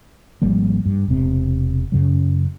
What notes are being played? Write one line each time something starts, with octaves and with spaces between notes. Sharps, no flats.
G#1 F3 G3 A#3
G2
E1 C3
F#2 C#3 F#3